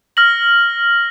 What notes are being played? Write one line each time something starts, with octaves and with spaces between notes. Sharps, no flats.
F6 A#6 F#7